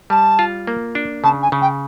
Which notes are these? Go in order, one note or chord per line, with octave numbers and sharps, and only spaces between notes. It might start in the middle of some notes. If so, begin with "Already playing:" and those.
G3 A5
F4
A#3
D4
C#3 A5
G#5
C#3
G5